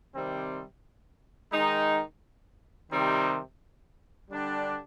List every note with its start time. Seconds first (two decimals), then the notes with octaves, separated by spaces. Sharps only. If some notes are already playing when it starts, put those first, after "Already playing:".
0.14 C3 D#3 G3 C4
1.53 D#3 G#3 D#4
2.91 C3 D#3 G3 C4 D#4
4.30 D3 G3 D4 G4